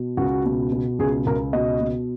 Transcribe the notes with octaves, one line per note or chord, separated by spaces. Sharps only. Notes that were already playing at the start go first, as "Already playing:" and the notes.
Already playing: B2
C#2 F#4
B2
B2
C#2 G#4
C#2 A#4
B2 D#5
B2